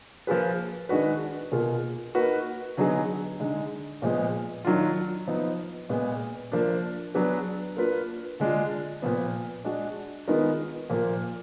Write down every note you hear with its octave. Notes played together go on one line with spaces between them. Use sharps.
F3 A#3 F4 G#4 B4
D#3 G#3 D4 F#4 B4
B2 A#3 F4 G#4
A#3 D#4 F#4 B4
D3 F#3 B3 D#4 G#4
D3 G#3 D#4
A#2 F3 G#3 B3
D#3 F#3 D4 F4
F3 B3 D#4
A#2 G#3 B3
F3 A#3 D4
F#3 B3 D4 G#4 B4
A#3 D4 F4 B4
D3 G#3 D4 F4
A#2 F3 B3
G#3 D4 F#4
D#3 G#3 B3 F4 A#4
A#2 F3 A#3